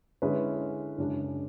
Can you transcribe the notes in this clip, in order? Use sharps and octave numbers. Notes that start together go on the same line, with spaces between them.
D3 G#3 C#4 E4 B4
F#2 C#3 G#3 D4 G#4